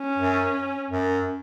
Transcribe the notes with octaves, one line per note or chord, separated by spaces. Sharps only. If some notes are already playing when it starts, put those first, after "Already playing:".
Already playing: C#4
F#2
F#2